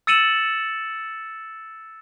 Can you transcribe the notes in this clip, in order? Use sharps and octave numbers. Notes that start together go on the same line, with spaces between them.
E6 A6 C#7 D#7 E7 F#7